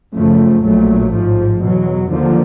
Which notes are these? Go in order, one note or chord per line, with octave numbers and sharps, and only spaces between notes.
F#2 C#3 F3 A3
A#1 A#2 F#3 A3
A1 G#2 F3
E2 B2 F#3
D#2 D3 F3 A#3